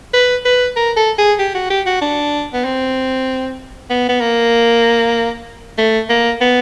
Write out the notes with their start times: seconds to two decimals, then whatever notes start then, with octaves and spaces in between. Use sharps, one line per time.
0.13 B4
0.45 B4
0.76 A#4
0.97 A4
1.18 G#4
1.39 G4
1.55 F#4
1.70 G4
1.86 F#4
2.01 D4
2.54 B3
2.64 C4
3.90 B3
4.09 B3
4.21 A#3
5.78 A3
6.09 A#3
6.41 B3